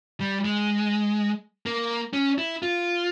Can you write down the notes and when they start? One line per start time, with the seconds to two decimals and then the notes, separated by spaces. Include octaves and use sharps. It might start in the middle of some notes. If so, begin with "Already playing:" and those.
0.20 G3
0.45 G#3
1.66 A#3
2.13 C#4
2.38 E4
2.62 F4